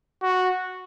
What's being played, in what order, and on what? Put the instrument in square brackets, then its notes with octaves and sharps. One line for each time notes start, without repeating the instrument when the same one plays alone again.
[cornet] F#4